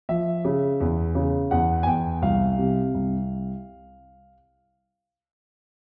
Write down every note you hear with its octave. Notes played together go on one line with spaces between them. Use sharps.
F3 E5
C#3
E2
C#3
E2 F#5
G#5
E2 G5
C2 F5
C3
C2